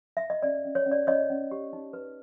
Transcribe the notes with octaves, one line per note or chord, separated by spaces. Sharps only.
E5
D#5
C#4 D5
C#4
C#5
C#4
D5
C#4 C#5 D#5
C#4
G4
D#4
B4